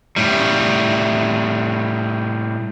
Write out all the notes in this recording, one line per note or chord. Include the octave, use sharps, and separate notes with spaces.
A2 G3